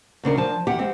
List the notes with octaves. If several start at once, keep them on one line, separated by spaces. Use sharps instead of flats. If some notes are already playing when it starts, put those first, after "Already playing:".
D2 C#3 D4 A#4
F3 A5
E2 G4 F#5
G#3 C4